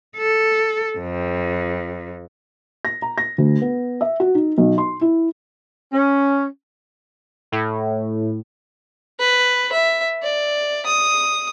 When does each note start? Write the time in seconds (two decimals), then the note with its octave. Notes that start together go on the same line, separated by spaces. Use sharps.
0.17 A4
0.98 F2
2.85 A#6
3.02 A#5
3.18 A#6
3.38 D2
3.62 B3
4.01 E5
4.20 F#4
4.35 D#4
4.58 B1
4.78 C6
5.01 E4
5.93 C#4
7.52 A2
9.20 B4
9.72 E5
10.23 D5
10.86 D#6